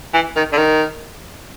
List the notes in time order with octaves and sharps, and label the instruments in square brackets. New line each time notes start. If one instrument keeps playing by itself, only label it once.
[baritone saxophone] E3
D#3
D3
D#3